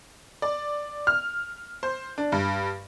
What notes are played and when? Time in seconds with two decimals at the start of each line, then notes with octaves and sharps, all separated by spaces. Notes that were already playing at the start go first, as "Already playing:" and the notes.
0.42 D5
1.07 F6
1.83 C5
2.18 D4
2.32 G2